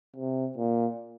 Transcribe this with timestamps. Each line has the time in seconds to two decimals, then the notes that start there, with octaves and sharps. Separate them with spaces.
0.16 C3
0.57 A#2